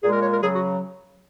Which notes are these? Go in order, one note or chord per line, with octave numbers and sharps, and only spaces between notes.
A#2 G#3 G#4
A#4
C#5
A#4
C#3 F#3 G#4
F#4